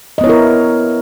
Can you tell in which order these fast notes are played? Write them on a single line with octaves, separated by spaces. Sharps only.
D#5 B3 C#5 E4 A#4